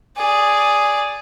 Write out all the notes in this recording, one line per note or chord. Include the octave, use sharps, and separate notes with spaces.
G#4 D5